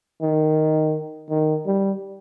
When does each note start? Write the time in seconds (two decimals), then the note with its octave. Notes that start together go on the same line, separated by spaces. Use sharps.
0.22 D#3
1.29 D#3
1.66 G3